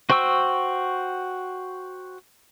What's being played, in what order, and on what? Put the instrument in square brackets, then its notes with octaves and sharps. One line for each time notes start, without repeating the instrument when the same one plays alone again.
[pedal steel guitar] F#4 C5 G5 C#6 E6